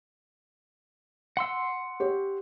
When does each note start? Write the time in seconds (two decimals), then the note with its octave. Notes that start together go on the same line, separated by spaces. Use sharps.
1.37 F#5 C6 E6
2.00 G4 C#5